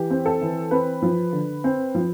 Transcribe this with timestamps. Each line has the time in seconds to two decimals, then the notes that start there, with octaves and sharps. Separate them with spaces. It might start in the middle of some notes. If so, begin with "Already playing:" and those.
Already playing: E3 G4
0.10 C4
0.26 A4
0.41 E3
0.71 C4 B4
1.02 F3
1.33 D3
1.64 C4
1.95 F3